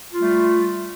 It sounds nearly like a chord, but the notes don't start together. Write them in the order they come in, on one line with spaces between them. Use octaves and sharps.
F4 G3 A3